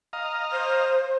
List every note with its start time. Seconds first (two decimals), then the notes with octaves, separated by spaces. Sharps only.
0.13 D#5 F5 A#5
0.52 C5